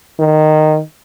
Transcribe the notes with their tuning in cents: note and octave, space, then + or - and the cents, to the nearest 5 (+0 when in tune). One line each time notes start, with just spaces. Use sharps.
D#3 -10